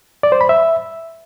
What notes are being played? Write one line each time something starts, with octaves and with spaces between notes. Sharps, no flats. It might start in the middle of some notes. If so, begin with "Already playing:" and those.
D5
C5
B5
E5